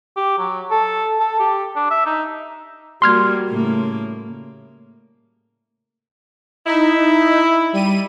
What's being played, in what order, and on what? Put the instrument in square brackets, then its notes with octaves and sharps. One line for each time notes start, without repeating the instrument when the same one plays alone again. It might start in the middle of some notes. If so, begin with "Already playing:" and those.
[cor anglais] G4
F#3
A4
A4
G4
D4
E5
D#4
[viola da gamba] G3 A#3 F#4 [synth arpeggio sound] C6 F6 G#6
[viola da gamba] A2 C#3 A#3
[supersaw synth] D#4 [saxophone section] E4
[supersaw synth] G3 D#7